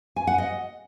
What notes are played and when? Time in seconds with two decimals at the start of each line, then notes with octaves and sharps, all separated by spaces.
0.16 G#5
0.27 F#5
0.38 D#5